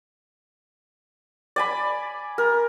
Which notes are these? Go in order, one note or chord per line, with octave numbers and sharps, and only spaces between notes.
D5 G#5 B5
A#4